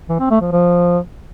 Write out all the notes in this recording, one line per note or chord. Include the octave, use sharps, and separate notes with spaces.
E3
C4
A3
F3
F3